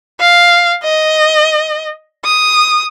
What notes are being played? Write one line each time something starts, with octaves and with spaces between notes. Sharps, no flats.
F5
D#5
D#6